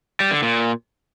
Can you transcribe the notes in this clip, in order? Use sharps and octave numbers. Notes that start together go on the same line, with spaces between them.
G3
D3
A#2